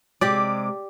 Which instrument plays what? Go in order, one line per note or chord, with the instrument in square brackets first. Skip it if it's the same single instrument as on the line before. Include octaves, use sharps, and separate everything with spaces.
[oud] C3 G#3 [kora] G4 D5 [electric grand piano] D6